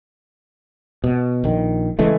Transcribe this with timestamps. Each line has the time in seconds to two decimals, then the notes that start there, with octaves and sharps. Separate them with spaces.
1.04 B2
1.44 A#1 D#3
1.99 C#3 E3 G#3 A3